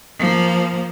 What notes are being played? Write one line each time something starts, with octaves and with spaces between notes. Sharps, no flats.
F3 A#3